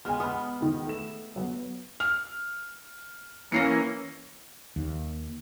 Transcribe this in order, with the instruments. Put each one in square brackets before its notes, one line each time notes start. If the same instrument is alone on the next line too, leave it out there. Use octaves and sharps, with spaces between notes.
[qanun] G#3 B3 [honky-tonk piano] G#5 F6
[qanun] B3 [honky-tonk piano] B5 D#6
[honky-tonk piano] E2 D#3
A3 E7
F#3 B3
[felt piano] F6
[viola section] E3 A#3 C#4 [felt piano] A#6 C7 C#7
[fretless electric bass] D#2